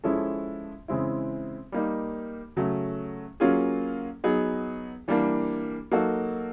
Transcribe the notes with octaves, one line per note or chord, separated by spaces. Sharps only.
F3 G#3 C#4 E4 A4
C#3 E3 G#3 C4 E4
G3 A#3 D#4
C#3 F#3 A3
F#3 A#3 C#4 F4 G#4
F#3 B3 D#4 G#4
E3 G3 A#3 D4
F#3 A#3 D#4 F#4 A4